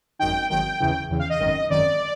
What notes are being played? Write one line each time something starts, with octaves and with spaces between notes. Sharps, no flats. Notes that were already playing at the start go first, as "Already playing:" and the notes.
G#1 F#2 D#3 G5
G#1 F#2 D#3 G5
E2 C#3 E3
E2 C#3 E3
F5
D#5
G#1 F#2 D#3
G#1 F#2 D#3 D5